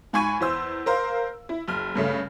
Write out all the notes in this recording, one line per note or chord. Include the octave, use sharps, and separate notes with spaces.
G#2 G#5 B5 C#6 G#6 D#7
E2 C5 E6
A#4 C5 F5 A#5
E4
F#1 F6
G2 C#3 A3